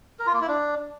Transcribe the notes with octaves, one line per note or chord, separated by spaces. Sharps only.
A#4
F4
A#3
E4
D4